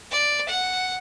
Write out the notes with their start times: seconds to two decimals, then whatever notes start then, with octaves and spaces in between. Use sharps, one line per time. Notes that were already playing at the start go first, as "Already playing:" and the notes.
0.11 D5
0.48 F#5